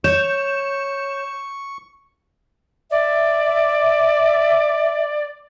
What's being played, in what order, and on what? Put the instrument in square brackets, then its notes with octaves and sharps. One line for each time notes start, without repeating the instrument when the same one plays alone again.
[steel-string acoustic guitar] C#5 [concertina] C#6 [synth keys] G6 E7
[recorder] D5 [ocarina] E5